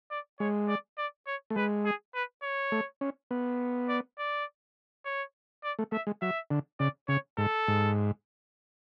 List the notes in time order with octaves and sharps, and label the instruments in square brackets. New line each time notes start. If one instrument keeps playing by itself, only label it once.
[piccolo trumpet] D5
[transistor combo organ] G#3 [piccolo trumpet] C#5
[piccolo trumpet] D5
D5
C#5
[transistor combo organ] A3
[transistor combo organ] G#3 [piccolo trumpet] B4
[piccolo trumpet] G#4
B4
C#5
[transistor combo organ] A3
C#4
B3
[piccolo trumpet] D5
D5
C#5
D5
[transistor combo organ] A3
[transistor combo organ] A3 [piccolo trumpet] E5
[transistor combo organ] G#3
[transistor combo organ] F#3 [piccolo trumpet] E5
[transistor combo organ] D3
[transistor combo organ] C#3 [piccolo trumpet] D5
[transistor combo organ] C#3 [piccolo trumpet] C#5
[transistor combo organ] G#2 [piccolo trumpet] A4
[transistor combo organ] G#2